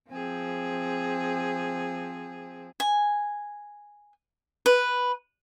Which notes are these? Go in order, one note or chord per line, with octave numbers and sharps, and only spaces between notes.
F3 C4 G#4
G#5
B4